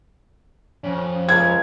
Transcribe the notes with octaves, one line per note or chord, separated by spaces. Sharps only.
F2 C#4
C#2 G#6